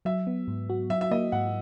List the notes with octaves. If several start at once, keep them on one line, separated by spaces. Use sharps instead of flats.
F#3 E5
B3
G#2
F#4
F#3 E5
E5
A#3 D#5
G#2 F#5